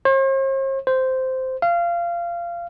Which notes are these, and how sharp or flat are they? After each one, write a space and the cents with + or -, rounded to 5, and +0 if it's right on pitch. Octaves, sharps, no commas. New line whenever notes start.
C5 +45
C5 -10
F5 -20